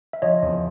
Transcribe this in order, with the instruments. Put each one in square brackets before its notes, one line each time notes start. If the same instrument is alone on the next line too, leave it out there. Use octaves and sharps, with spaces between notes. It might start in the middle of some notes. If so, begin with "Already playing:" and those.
[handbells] E5
[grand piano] F3 [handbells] C#5 D#5
[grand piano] E2